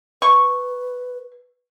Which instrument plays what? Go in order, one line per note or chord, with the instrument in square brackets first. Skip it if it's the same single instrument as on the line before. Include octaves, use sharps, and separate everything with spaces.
[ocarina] B4 [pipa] C#6